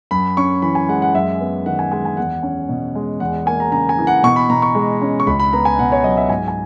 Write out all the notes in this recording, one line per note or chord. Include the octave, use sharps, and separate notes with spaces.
F#2 B5
C#4 C#6
E3 B5
G#5
G#3 F#5
F#5
F#2 E5
B3
D#3 F#5
G#5
G#3 G#5
G#5
E2 F#5
C#4
B2
G#3
E2 F#5
A#3 G#5
A#5
C#3 A#5
G#5
E3
F#5
B2 C#6
B5
B2 A#5
C#6
G#3
C#4
C#6
C#2 B5
B5
B3 A#5
G#5
B2 F#5
C#5
F#3 D#5
E5
G#2 G#5
G#5